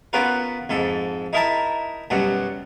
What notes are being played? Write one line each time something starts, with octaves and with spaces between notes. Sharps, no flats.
B3 C#4 F4 F#4 A#4 B4
F2 G#2 A4
D#4 E4 A#4 E5 A5 A#5
F#2 B2 F#3 G3 F#4